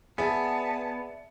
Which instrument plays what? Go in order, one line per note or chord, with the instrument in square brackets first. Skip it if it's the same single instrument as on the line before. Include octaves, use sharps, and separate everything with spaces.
[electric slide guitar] B3 [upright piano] G#4 [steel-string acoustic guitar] D5 E5 [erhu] A5